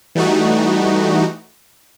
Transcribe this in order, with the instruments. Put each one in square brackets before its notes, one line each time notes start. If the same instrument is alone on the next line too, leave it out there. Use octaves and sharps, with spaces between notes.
[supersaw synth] E3 G3 A3 D#4 F#4